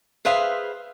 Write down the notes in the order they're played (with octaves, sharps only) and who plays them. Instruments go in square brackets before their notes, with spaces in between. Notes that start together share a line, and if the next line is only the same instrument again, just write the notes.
[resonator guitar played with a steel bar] G#4 B4 C5 E5 F5